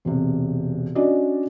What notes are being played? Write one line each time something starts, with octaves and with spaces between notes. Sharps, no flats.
E1 C3
C#4 D4 F#4 D5 D#5